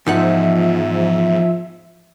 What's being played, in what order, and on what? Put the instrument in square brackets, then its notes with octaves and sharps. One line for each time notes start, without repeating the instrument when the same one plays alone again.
[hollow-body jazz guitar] E2 D#4 F#5 [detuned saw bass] G#2 [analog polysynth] F3 E5